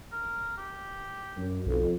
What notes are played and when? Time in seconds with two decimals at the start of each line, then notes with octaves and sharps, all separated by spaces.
0.12 A#4
0.57 G4
1.36 F#2
1.66 B1 F2